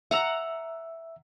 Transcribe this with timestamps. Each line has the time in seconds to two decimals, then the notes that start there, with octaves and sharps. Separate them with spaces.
0.11 E5 F#5 A#5 E6